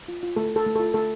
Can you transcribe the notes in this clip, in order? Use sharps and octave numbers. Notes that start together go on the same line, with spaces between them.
F4
F4
A3 A4
A3 A4
A3
F4 A4
A3 A4